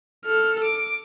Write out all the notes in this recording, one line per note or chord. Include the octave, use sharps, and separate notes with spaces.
A4 F6
D6